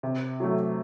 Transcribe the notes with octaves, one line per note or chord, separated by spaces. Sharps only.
C3
F#3 A3